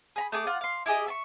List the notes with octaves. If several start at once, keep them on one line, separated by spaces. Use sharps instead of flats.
G#4 A#5 B5
A3 G#4 G#5 D6
F4 F#5
F5 C6
E4 G4 G#4 D#5
E5 A5 C#6